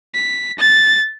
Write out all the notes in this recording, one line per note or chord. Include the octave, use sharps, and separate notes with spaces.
B6
A6